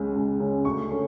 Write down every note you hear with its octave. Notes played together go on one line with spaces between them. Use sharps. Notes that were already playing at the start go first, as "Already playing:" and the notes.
Already playing: C#2 C#3 G#3 C#4
C#2
C#3 G#3 C#4
D2 C#6
A3 C#4